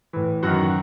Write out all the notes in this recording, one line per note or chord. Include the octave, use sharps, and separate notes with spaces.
A2 E3
F#2 D#3 F#4 F#5